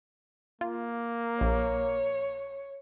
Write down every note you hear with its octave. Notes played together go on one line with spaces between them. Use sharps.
A#3 F4
A#1 C#5